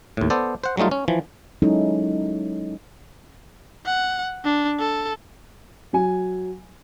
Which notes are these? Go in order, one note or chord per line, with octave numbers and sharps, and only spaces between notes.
D#2 A2
B3 A4 C5 D5
C5 F#5
F#3 G3 A3 D#4 F4
C#4
E3 F3
F#3 G#3 C#4 D#4 E4 A4
F#5
D4
A4
F#3 G#5